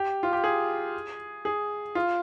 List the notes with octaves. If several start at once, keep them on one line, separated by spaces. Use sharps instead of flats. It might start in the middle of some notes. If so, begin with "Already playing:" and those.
Already playing: G4
F4
G4
G#4
G#4
F4